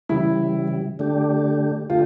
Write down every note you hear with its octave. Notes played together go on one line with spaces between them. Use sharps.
C#3 E3 G3 E4
D3 A3 D4 G4
D3 A3 F4 G4